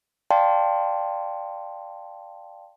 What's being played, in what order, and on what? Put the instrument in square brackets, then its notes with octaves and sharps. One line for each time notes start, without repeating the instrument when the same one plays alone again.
[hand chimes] D5 F5 G5 A5 C6